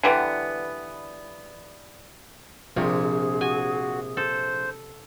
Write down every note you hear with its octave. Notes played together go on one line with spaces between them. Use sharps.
D3 E3 G3 B3
A#1 C3 G#4
F#4 G#5
A4 C5